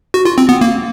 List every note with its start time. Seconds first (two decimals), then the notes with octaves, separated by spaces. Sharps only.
0.14 F#4
0.25 F4
0.38 C4
0.49 B3
0.61 A#3